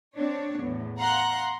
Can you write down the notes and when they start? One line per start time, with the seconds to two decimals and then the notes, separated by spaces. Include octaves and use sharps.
0.16 C4 D4 C#5
0.61 E2 A2
0.98 F5 F#5 A#5 C6 F#6